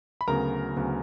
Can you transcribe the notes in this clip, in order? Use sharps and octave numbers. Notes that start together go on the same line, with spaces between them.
B5
D2 C#3 F#3 B3 A#4 A#5
D2 C#3 F#3 B3